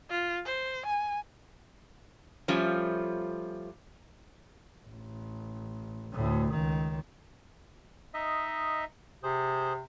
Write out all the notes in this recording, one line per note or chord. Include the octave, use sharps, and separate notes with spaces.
F4
C5
G#5
F3 G3 A3 C#4 F4
A1
D2 A2
C#2 D#3
D#4 D#5 E5
C3 G#4 C5